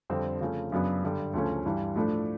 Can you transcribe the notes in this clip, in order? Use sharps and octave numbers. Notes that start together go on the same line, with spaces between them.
F2 D3 G3 C4
C#3 F3 A3 C#4
F#2 C#3 F#3 B3 D4
G2 D3 G3
D2 C#3 F3 A3 C#4
G2 E3 G3
A2 F3 A3 D4